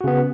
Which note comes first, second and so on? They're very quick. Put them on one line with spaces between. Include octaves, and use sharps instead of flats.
F#4 C#3 B3